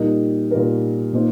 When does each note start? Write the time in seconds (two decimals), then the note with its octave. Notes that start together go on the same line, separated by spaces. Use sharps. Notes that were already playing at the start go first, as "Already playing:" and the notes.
Already playing: A#2 G3 D#4 A#4
0.51 A#2 G3 D#4 A#4
1.13 A#2 A#3 D#4 C5